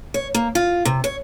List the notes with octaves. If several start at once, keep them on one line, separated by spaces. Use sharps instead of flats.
C#5
A#3
F4
C3
C#5